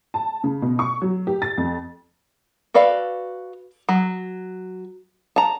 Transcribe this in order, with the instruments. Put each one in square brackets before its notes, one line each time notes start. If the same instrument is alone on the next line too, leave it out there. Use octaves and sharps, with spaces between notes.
[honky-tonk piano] A5
C#3
B2
C#6
F#3
G4
A6
F2
[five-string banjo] F#4 A4 B4 D5 F5
F#3
A5 A#5